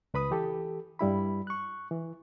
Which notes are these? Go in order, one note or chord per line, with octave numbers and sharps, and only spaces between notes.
C#2 B4 B5 D#6
E3 G4 A4
G2 G3 E4 B5
C#6 F#6
E3